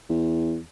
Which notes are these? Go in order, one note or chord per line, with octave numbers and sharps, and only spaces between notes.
E2